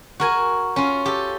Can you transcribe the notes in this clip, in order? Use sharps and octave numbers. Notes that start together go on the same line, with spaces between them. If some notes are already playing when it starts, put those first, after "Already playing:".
F#4 A#4 G#5
C#4 F4
G4 A4